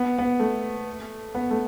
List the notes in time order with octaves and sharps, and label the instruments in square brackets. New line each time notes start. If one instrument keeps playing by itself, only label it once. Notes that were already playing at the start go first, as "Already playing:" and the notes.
Already playing: [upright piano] B3
B3
A3
B3
A3